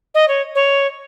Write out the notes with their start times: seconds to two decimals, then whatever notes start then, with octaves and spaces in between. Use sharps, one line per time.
0.14 D#5
0.28 C#5
0.55 C#5